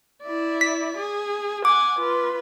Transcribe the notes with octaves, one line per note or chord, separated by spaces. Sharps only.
E4 D5
B6
G#4
F#5 G#5 D6
F4 B4